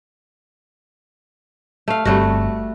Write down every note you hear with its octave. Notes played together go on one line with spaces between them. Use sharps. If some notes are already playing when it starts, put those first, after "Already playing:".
A3 F5
G1 G3 A3 C4 F#4